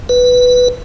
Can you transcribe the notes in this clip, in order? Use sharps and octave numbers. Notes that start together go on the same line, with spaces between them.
B4